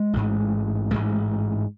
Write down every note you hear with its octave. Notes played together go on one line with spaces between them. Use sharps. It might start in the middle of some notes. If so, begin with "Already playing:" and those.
Already playing: G#3
A1 G#2
A1 G#2 G#3